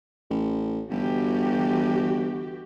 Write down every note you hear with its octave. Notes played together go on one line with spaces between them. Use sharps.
A1
G1 E3 F#4 G4